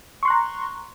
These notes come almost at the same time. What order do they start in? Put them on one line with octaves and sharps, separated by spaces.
C#6 C6 F#6 A#5